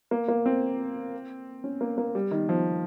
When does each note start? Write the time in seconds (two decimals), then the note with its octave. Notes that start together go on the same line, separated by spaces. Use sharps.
0.11 A#3
0.28 A#3
0.46 C4
1.64 C#4
1.81 A#3
1.98 A#3
2.15 G3
2.31 D#3
2.49 F3